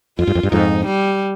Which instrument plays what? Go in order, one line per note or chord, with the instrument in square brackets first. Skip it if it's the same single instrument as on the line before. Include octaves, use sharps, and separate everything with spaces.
[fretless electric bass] F2 [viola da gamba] F4
[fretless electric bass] G2
F2
G2
[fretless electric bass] F2 G#2 [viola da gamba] D#4
[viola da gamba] G3